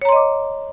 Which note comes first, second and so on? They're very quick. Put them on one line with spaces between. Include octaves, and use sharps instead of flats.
C#5 A#5 C6 D#5 D6